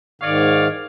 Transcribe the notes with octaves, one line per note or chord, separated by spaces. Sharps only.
G#2 D#3 C#5 D5 F5